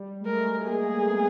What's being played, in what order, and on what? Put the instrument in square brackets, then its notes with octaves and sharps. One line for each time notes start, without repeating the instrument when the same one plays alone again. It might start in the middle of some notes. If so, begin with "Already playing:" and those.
Already playing: [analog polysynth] G3
G#3
[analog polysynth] A3 [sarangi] A#4
[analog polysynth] A#3 [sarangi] G#4
[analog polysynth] B3